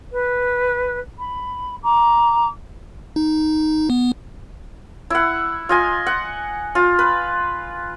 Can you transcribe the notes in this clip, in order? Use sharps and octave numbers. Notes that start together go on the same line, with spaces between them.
B4
B5
A#5 D6
D#4
B3
E4 F#5
F4 D#5 G#5
F#5
F4
B4